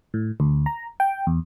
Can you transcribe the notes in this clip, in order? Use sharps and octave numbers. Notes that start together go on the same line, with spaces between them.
A2
D2
A#5
G5
E2